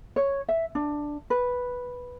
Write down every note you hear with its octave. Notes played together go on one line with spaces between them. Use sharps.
C#5
E5
D4
B4